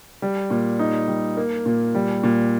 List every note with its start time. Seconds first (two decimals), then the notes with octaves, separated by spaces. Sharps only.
0.22 G3
0.50 A#2
0.79 D#4
1.08 G3
1.37 A#3
1.66 A#2
1.95 G3
2.23 A#2